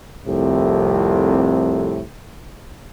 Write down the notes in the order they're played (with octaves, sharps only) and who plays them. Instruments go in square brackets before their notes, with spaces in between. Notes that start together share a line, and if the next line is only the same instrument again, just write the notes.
[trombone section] C2 F2 A2 C3